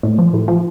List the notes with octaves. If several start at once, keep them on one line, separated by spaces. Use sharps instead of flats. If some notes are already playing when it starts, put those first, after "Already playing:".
A2
F3
A2
F3